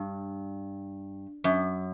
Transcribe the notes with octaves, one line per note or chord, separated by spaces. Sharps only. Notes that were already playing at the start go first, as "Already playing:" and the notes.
Already playing: G2
F#2